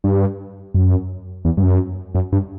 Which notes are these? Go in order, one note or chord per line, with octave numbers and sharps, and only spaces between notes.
G2
F#2
E2
G2
F#2
F#2
G2